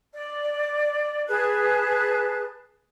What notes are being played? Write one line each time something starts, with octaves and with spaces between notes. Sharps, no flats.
D5
G#4 B4 A5 F#6